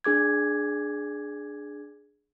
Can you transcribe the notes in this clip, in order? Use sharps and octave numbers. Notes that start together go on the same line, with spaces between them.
D4 G#4 D6 G#6